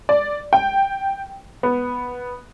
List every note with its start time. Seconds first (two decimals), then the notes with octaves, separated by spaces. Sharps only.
0.09 D5
0.53 G5
1.63 B3